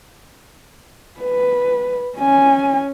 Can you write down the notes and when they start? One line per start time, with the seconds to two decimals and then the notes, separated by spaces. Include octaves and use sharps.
1.21 B4
2.18 C#4 G#5